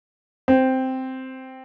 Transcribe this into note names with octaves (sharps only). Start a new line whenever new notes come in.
C4